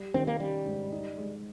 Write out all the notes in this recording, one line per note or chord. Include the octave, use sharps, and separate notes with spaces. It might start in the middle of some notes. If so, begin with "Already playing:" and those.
Already playing: G3
D#3 C4
A#3
G3 C#4
G#2
D#4
G#3